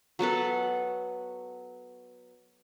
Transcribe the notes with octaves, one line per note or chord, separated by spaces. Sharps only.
F#3 B3 A4 B4